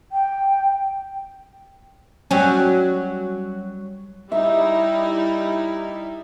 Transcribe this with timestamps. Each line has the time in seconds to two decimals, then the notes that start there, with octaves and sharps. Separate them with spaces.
0.12 G5
2.31 F#3 G3 C#4
4.32 G3 D#4 E4 E5